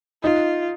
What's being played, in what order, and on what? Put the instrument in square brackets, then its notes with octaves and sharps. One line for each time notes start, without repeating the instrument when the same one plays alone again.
[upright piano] D#4 [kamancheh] F4